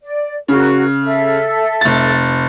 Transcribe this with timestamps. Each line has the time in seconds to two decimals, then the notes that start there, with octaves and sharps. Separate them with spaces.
0.02 D5
0.48 C#3 F#4 A#4
1.02 A4 E5
1.81 F1 A6